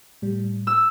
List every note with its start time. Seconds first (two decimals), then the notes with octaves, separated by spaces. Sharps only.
0.22 A2 G3
0.67 E6